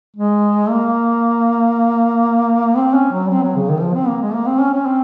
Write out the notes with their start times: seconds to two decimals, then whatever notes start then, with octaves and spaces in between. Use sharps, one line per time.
0.17 G#3
0.69 A#3
2.77 C4
2.94 C#4
3.12 F#3
3.30 C4
3.43 F#3
3.56 C#3
3.69 D#3
3.81 F3
3.95 C4
4.08 A#3
4.22 G#3
4.34 A#3
4.47 C4
4.61 C#4
4.73 C#4
4.86 C4